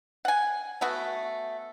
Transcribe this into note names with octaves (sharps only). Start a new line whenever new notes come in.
F#5 G#5
A3 B3 F#4